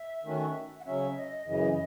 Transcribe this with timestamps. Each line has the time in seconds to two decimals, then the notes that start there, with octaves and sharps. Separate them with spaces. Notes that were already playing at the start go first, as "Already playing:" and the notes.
Already playing: E5
0.24 D#3 A3 C#4 F#4
0.80 F#5
0.85 C#3 F#3 C#4 E5
1.17 D#5
1.47 F#2 C#3 E3 D#5